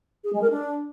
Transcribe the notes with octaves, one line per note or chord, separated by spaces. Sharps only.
G#4
G#3
A#4
D4